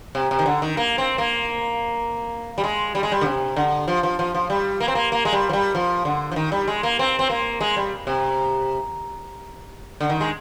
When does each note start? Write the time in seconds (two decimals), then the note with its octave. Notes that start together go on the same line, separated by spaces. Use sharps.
0.15 C3
0.31 C3
0.39 D#3
0.46 D3
0.62 D#3
0.77 A#3
0.98 C4
1.18 A#3
2.58 G3
2.64 G#3
2.95 G3
3.03 G#3
3.12 G3
3.21 D3
3.26 C3
3.56 D3
3.88 F3
4.03 F3
4.19 F3
4.35 F3
4.50 G3
4.80 A#3
4.88 C4
4.95 A#3
5.12 A#3
5.25 G#3
5.32 G3
5.49 F3
5.53 G3
5.75 F3
6.05 D3
6.32 F3
6.36 D#3
6.52 G3
6.68 G#3
6.83 A#3
6.99 C4
7.19 C4
7.30 A#3
7.61 G#3
7.77 G3
8.07 C3
10.01 D3
10.09 D#3
10.21 G#3